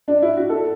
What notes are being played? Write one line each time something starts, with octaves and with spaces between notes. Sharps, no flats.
D4
E4
F#4
A4